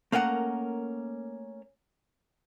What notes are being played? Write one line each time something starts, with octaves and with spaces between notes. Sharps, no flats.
A3 A#3 C#4 A#4 F#5